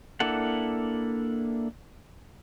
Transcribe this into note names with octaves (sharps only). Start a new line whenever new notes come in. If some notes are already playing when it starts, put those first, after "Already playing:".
A#3 D4 E4 A4 F#5